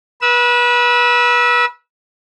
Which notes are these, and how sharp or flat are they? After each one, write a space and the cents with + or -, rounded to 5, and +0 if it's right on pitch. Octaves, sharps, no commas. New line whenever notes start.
B4 -30 E6 -15